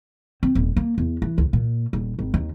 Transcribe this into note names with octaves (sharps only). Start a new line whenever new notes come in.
C4
D#1
A#3
E2
E3
D2
A#2
D#1
G#1
D#2